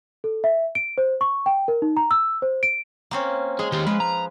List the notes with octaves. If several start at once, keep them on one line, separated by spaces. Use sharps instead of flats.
A4
E5
D7
C5
C#6
G5
A#4
D#4
A#5
E6
C5
D7
A#3 C4 C#4
G#3 G#4
D#3 F4 G4
F3 G#3 B4
A#5